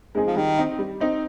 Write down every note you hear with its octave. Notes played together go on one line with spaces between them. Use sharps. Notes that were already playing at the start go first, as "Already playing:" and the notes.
G#3 C4 D#4 G#4
F3
D#3 G3
C4 D#4
G3
C4 D#4